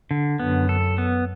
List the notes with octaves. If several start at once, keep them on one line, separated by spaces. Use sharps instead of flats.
D3
F#2 B3
A4
B3